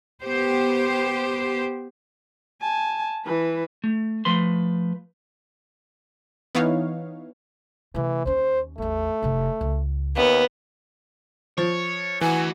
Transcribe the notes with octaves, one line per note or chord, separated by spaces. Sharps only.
B3 G4 C5
G#5 A5
E3 B4
A3
F3 A3 B4 C6
E3 B3 D#4 E4 C#5 F5
C3 E3 A3
D#2 C#4 C5
A1 E2 A3
F1 C3
C#2
D#2 B3
F3 C#5
D2 E3 F#4 G#5